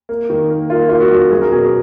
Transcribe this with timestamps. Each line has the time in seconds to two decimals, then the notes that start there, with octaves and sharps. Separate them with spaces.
0.09 A#3
0.30 D#3
0.50 A#3
0.70 A#3 F4
0.89 A#3 F4
1.00 F#4
1.11 F#2
1.31 F#3 G#4
1.41 A#4
1.52 B2 G#4
1.63 A#4